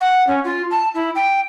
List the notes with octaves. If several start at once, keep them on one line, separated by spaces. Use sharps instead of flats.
F#5
C#4
F4
A5
E4
G5